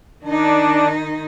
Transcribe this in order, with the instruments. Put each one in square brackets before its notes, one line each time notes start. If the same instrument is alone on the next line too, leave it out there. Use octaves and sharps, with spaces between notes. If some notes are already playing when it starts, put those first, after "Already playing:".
[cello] D#3 D#4 [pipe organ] D4